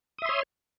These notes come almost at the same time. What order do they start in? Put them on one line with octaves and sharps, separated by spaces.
D#6 E5 C6 C#5